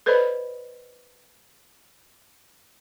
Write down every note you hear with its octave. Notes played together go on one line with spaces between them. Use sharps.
A4 B4 C5 D5 D#5 B5